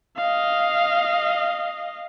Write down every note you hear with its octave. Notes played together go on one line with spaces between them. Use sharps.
D#5 F5